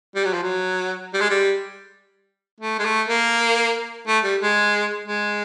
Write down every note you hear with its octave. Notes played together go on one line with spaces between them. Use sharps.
G3
F#3
F3
F#3
G3
G#3
G3
A3
G#3
A3
A#3
A3
G3
G#3
G#3